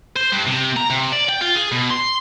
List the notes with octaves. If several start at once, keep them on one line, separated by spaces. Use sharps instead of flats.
C5
G2
C3
A#5
C3
D5
G5
F4
G#4
B2
C6